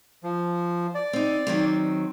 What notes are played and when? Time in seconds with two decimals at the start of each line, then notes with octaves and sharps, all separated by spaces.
0.23 F3
0.95 D5
1.13 C4 D#4
1.47 D#3 F#3 C4